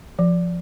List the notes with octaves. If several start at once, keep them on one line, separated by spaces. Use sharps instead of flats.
F3